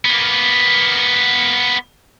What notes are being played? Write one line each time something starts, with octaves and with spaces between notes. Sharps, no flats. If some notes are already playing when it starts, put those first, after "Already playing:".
A#3 B3